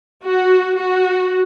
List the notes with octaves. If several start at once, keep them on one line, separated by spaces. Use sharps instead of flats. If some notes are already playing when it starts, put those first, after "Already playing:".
F#4
F#4